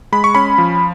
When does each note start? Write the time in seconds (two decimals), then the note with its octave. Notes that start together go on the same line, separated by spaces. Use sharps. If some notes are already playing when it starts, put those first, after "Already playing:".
0.12 G#3 B5
0.24 C#6
0.35 C#4 B5
0.58 F3